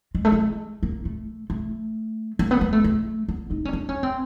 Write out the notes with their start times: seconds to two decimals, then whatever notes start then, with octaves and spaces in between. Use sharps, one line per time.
0.15 G#3
0.25 A3
0.32 G#3
0.83 A#3
1.05 A3
1.50 A3
2.39 A#3
2.51 B3
2.61 A#3
2.73 A3
2.84 A3
3.28 B3
3.51 D#4
3.65 C#4
3.73 D4
3.89 C#4
4.03 C4